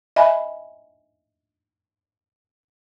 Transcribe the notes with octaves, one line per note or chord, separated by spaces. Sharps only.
D#5 E5 G#5 B5